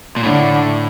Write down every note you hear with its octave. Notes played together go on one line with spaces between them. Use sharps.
A#2
A2 D3